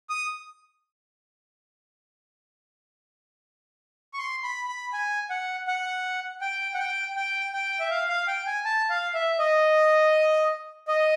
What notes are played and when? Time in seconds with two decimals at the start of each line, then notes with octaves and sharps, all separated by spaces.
0.10 D#6
4.14 C#6
4.19 C6
4.43 B5
4.68 B5
4.93 G#5
5.30 F#5
5.67 F#5
6.41 G5
6.74 F#5
6.78 G5
7.16 G5
7.53 G5
7.80 E5
7.90 F5
8.09 F5
8.28 G5
8.46 G#5
8.65 A5
8.90 F5
9.14 E5
9.39 D#5
10.88 D#5